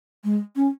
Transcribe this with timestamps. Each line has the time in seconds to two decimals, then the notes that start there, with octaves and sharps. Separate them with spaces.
0.24 G#3
0.56 C#4